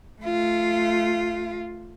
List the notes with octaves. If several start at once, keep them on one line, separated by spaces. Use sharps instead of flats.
A3 F4